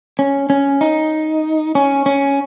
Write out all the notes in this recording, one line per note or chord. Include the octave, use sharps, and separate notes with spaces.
C#4
C#4
D#4
C#4
C#4